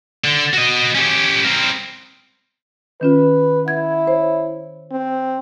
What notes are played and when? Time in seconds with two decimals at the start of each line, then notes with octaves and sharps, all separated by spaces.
0.24 D3
0.53 F#4 D#5
0.95 C#4 G4
1.45 C4 A#4
3.01 D#3 C#4 F4 B4
3.66 E4 F#5 G#6
4.07 C5 C#5
4.92 C4